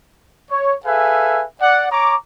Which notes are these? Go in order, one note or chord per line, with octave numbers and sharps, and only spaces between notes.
C#5
G#4 A4 B4 E5 F5 G#5
D5 F#5
C#5 A#5 C#6 D6